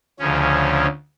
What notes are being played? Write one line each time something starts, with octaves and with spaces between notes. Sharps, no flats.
D2 C#3 F3 C#4